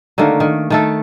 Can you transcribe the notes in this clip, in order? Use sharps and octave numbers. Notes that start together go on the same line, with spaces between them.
D3 D#3 A3 A#3
D#3
D#3 A3 A4